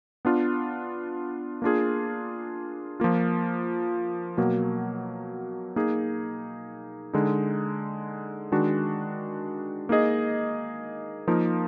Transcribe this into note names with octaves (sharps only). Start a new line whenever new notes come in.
B3 D4 F4
A#3 D4 F4 G#4
F3 A#3 F4
B2 F#3 A#3
A#3 D#4 G#4
D3 G#3 D#4
D#3 G#3 D4 F#4
A#3 D#4 G#4 D#5
F3 A#3 D#4 A#4